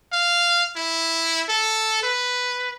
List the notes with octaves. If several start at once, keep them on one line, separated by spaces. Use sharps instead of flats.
F5
E4
A4
B4